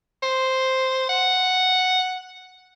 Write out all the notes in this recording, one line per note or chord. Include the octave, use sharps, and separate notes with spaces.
C5
F#5